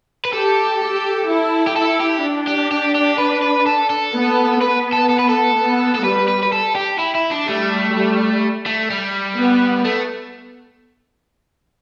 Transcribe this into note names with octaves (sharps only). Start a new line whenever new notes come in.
B4
G4 A4
G4
E4
G4
E4 A4
G4
D4
G4
G4
G4
B4
B4
A4
A4
B3
B3 B4
A4
A4
B4
A4
B3
A4
G3 B4
B4
B4
A4
G4
E4
E4
D4
G3 A3
G3
A3
G3
B3
A3